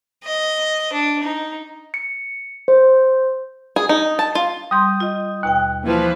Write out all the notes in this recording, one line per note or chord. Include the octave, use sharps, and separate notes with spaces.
D#5
D4
D#4
C#7
C5
G#4
D#4
A5
F4
G3 C6 D#6 G6
F4 D#5
D#2 B2 G5 F#6
E3 F3 A#3 B4